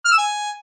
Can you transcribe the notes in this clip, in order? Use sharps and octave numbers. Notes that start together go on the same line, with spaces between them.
F6
E6
G#5